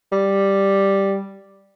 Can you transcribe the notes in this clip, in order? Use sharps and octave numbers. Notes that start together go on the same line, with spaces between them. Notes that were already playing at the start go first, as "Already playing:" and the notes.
G3